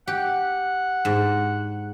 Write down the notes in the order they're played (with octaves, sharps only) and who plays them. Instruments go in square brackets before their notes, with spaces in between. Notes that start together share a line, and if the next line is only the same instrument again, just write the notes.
[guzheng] G4 [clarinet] F#5
[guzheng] G#2